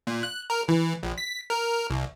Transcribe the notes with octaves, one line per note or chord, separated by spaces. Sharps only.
A#2
F#6
A#4
E3
A#1
B6
A#4
C2